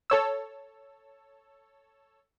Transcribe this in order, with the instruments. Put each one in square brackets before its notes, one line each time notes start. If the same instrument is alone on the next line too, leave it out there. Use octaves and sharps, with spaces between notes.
[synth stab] A4 C#5 E6